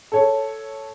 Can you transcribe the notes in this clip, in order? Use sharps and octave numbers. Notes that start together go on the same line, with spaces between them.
A4 C#5